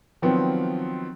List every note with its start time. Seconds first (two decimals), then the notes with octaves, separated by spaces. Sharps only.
0.22 D#3 F3 F#3 B3 C4